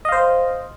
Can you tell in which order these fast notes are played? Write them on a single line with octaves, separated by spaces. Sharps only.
D#5 F5 C5